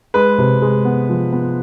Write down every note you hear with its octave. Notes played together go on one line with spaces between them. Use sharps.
G#3 B4
C3
G#3
B3
F3
B3